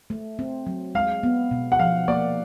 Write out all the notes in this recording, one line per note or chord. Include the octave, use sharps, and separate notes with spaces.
A3
C4
F#3
G#3 F5
B3
B2
F#5
F3 F5
A#3 D5